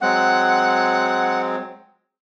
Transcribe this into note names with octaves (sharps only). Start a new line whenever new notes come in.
F#3 G#3 C4 F#5